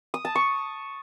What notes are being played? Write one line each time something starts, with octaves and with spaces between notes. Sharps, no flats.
D#6
A5
C#6